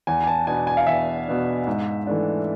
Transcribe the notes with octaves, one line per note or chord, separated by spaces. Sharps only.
E2 G#5
G#5
A5
B2 B3 D4 G#5
G#5
F5
E2 E5
B2 B3 D4
G#2
E3 A3 D4